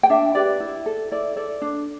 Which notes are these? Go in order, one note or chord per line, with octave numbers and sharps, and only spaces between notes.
G5
D4 E5
G4 B4 D5
E4
A4
E4 D5
A4 D5
D4